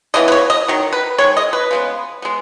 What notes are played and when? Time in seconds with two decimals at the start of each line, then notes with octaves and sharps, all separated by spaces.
0.14 C#3 E3 B3 D#5
0.28 B4
0.32 C#5
0.50 D#5
0.68 D#3 F#3
0.93 B4
1.18 D#3 G#3 C#5
1.37 D#5
1.53 B4
1.71 C#3 G#3 B3
2.22 G#3 B3